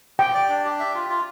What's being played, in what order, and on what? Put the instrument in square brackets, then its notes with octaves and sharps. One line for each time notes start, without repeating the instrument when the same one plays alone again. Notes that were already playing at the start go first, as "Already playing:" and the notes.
[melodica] G4 [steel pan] G5
[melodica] D5
D4
G4
E5
F4
F4